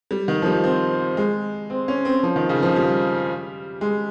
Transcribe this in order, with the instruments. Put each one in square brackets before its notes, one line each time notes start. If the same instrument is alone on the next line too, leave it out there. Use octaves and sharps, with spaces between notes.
[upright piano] G3
D#3
F3
G3
C4
G#3
C4
C#4
C4
F3
D#3
C#3
F3
G3
G#3